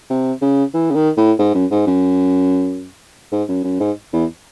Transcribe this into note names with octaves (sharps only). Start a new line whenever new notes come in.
C3
C#3
E3
C#3
D#3
A2
G#2
F#2
G#2
F#2
G#2
F#2
F#2
G#2
E2